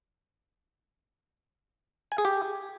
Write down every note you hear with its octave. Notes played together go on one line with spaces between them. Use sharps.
G#5
G#4
G4